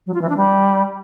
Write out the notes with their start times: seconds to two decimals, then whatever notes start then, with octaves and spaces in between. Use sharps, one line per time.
0.06 F#3
0.14 F4
0.21 E3
0.29 D4
0.36 G3